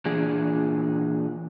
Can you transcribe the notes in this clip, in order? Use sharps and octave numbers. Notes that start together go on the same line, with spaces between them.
A#2 E3 D4 G#4